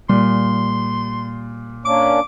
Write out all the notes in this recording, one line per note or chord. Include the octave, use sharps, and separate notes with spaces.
A#2 G3 C6
A#3 C#4 D4 D6